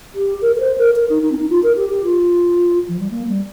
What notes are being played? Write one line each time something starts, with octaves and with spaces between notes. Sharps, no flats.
G4
A#4
A#4
C5
A#4
A#4
D#4
D#4
C4
D#4
F4
A#4
G4
G4
F4
F3
G3
A#3
G3